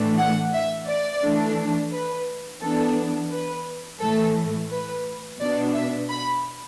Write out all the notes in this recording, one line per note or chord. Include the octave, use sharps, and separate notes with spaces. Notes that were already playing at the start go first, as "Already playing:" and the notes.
Already playing: A2 E3 A3 D4
F#5
E5
D5
E3 A3 D4
B4
E3 B3 D4 A4
B4
A2 E3 A3 A4
B4
B2 B3 D4 D5
E5
B5